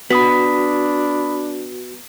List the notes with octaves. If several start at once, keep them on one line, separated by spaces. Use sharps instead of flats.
B3 D4 F#4 B5 D#6 B6